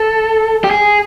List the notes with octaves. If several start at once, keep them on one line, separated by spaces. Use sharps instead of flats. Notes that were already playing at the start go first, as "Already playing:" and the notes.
Already playing: A4
G4
G#4